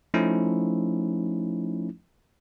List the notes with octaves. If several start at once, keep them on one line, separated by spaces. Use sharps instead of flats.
F3 A3 C#4 D#4 E4